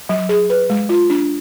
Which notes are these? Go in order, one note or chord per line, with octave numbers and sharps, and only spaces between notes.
F#3
G#4
B4
G#3
F4
D4